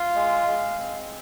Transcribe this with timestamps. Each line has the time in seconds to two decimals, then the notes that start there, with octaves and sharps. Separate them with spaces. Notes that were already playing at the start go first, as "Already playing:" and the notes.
Already playing: F4 F5
0.15 G#3
0.47 G#3
0.78 C4